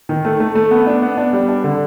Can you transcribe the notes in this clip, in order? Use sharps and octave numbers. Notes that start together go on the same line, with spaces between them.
D#3
A3
A3
A3
B3
D4
B3
D4
G3
D4
D3